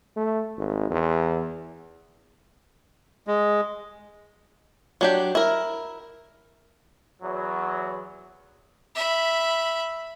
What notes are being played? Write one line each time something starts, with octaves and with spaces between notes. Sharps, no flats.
A3
G#1
E2
G#3
F#3 D4 G4
E4 A#4
E2 F#3
E5 B5